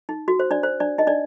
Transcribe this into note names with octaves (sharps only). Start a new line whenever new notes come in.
D#4
F#4
C5
D4 D5
C5
D4 D5
D#4 D#5
D4 D5